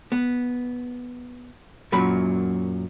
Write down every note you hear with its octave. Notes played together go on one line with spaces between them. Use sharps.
B3
F#2 A#2 F#3 B5